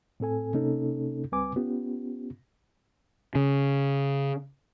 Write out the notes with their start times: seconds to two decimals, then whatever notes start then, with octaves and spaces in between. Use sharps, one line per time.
0.20 A2 C4 A4 G#5
0.54 C3 A#3 C#4 D#4 A4
1.32 C#2 G3 C4 B4 G#5 D6
1.56 B3 C#4 F4 G4
3.35 C#3